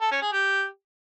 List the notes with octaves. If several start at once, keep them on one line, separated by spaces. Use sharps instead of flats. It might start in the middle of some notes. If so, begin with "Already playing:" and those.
A4
C#4
G#4
G4